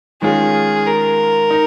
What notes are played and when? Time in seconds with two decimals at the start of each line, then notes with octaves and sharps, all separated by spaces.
0.22 D#3 G#3 C#4 F4 G#4
0.87 A#4
1.50 D#4